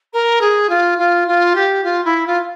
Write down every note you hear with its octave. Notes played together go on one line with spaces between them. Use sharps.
A#4
G#4
F4
F4
F4
G4
F4
E4
F4